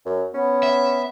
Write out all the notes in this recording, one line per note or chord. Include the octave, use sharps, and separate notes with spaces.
F#2
B3 C#4
E5